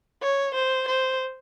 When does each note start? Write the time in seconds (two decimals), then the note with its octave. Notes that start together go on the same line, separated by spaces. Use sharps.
0.22 C#5
0.55 C5
0.88 C5